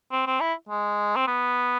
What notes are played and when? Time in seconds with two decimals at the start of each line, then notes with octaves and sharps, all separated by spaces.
0.12 C4
0.27 C4
0.40 E4
0.69 G#3
1.16 C4
1.27 B3